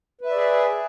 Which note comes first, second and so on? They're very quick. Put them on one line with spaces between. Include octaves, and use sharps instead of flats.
B4 E5 D5 G#4